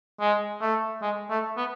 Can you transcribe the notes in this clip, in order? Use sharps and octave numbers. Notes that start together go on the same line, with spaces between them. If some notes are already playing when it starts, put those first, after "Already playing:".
G#3
A3
G#3
A3
B3